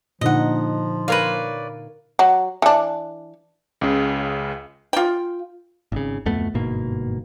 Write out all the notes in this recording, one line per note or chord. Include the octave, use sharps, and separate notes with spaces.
A#2 D3 F3 D#4 D#5 F#5
A#4 B4 C#5 D5 F5
F#3
E3 D4
C#2 C#3
F4 G5
G#1 C#3
D1 F2 A3 B3
G1 G#2 B2 A#3